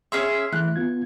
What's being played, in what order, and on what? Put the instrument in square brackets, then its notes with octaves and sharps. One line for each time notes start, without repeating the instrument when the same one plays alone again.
[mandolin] C#4 G#4 E5 [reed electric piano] C6
[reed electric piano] E3 A3 E5 [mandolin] F#6
[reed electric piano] B3 F4 G#6